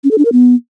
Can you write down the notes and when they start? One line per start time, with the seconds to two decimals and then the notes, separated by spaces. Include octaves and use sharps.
0.04 C#4
0.11 A4
0.18 D4
0.25 A#4
0.32 B3